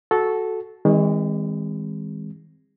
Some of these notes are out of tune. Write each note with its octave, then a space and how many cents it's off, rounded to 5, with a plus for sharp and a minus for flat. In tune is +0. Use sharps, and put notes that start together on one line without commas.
F#4 +0 A4 -10
D#3 +30 G#3 -35 C4 +0